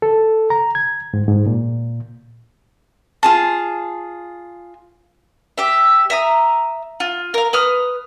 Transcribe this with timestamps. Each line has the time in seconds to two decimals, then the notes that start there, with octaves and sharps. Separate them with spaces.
0.02 A4
0.50 A#5
0.75 G#6
1.14 G#2
1.28 G#2
1.47 A#2
3.23 F4 G#4 A5
5.58 G4 E5
6.10 E5 A#5 D#6
7.00 F4
7.34 A#4 F5
7.53 B4 D#6 F6